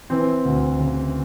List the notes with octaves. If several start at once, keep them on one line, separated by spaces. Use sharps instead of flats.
E3 C4
D2
C#3